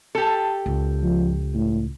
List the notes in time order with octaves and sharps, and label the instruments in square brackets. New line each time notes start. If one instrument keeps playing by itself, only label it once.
[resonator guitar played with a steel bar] G4 A4
[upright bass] C#2
[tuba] F3
A2